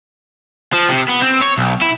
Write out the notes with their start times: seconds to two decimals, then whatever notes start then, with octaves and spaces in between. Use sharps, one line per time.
0.74 F3
0.90 C3
1.09 B3
1.23 C4
1.41 C#5
1.58 B1
1.82 E4